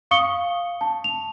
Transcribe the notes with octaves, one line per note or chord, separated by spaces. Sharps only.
F5 C#6 D#6 C#7 G7
A5
F7